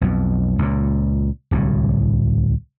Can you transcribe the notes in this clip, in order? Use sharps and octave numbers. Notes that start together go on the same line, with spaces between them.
B1 F2
C#2 A#2
D1 C2 A2